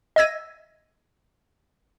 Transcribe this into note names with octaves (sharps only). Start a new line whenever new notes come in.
D#5 E5 E6 G#6 A#6 D#7